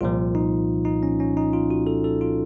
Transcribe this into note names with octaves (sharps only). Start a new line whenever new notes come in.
C2 A#2 F3 F4
D#4
D#4
C#4
C#4
D#4
F4
F#4
A4
A4
F4